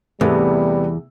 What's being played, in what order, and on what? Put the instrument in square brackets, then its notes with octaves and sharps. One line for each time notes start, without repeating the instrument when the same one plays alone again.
[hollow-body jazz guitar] E2 [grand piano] C3 A3 B3 [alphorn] G3